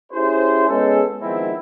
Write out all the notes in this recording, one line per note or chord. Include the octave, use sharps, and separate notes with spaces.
C#4 E4 G4 G#4 C5
G#3 B3 C#4 G#4 A4
D#3 F3 G#3 B3 C4 E4